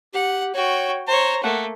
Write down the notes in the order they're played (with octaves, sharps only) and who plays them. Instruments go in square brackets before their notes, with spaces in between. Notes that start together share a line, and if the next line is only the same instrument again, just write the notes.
[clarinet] G4 [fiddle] F#5
[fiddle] F#4 G5 [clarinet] C#5
[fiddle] C5 C#5 [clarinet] A#5
[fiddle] A3 A#3 [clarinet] F#5